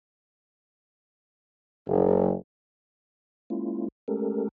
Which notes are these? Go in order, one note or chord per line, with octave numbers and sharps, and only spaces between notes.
F#1
G#3 A#3 C#4 E4 F4
G#3 A3 C#4 G4 A4 A#4